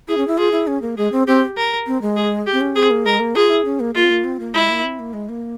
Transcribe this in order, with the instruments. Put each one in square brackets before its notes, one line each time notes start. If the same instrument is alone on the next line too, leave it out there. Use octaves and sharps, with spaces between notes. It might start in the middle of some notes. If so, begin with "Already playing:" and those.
[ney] E4 [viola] G#4
[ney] C#4
E4
[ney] F4 [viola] G#4
[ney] E4
C#4
A#3
[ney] G#3 [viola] G#4
[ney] C4
[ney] C4 [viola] G4
[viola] A#4
[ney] C4
G#3
[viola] G#4
G4
[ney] C4
C#4
[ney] C4 [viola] G#4
[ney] A#3
[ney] G#3 [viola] A#4
[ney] A#3
[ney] F4 [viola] G#4
[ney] E4
C#4
A#3
[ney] A#3 [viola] F4
[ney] C4
A#3
C4
A#3
[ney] G#3 [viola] E4
[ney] A#3
C4
A#3
G#3
A#3